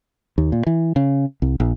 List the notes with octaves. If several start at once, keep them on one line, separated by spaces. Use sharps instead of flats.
D#2
A#2
E3
C#3
C2
A#1